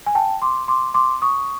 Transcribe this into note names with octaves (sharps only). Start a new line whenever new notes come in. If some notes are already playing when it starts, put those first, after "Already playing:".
G#5
G5 A5
C6 D6
C6 D6
C6 D6
C#6 D#6